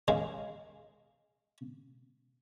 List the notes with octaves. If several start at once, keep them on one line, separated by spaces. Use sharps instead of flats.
C#3 G#3